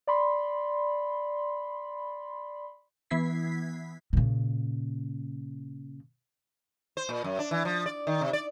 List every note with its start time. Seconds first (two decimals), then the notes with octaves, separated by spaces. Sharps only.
0.07 D5 B5 C6
3.10 E3 B3 E4 G#6 B6 C7
4.13 A#2 C#3
6.97 C5
7.09 A#2
7.24 F#2
7.39 D4
7.51 E3
7.65 F3
7.86 D5
8.07 D#3
8.21 C3
8.33 D5